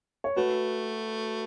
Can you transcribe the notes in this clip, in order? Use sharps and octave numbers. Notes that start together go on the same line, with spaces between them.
C#5
A3 F#4 B4